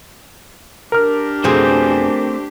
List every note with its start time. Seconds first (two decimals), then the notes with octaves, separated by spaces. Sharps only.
0.92 D4 G4 A#4 F6
1.44 F2 B2 A3 C4 G#4 C5